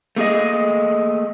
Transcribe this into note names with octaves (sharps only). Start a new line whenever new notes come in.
A3 A#3 G#4 D#5